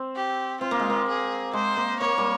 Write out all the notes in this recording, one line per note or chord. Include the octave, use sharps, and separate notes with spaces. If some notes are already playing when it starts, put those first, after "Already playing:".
Already playing: C4
G4
C4 F4
A#3
G#3
A#3
G#4
G#3 C5
A#3
A#3 C#5
G3